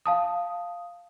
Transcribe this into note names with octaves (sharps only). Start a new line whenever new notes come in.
F5 A5 D#6